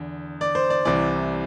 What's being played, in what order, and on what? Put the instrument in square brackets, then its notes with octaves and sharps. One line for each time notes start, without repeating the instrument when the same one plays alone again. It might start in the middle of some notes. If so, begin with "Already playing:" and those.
Already playing: [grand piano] E2 D3
D5
C5
D5
C2 C3 E3 D5